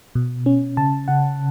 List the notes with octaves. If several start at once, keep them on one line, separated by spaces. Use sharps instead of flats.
B2
C#4
C#3 A5
C#3 F#5